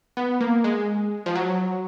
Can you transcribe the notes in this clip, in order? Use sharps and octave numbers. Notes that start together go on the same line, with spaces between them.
B3
A#3
G#3
F3
F#3